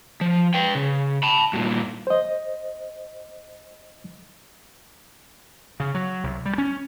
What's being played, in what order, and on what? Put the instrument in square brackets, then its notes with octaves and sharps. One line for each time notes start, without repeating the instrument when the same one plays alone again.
[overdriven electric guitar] F3
B4 G5
C#3
A5 B5
G2 A#2
[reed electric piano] C5 D#5
[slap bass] C#3
F#3
C2
G3
C#4